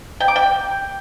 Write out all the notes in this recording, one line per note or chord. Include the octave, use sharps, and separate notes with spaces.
G5
D6
G5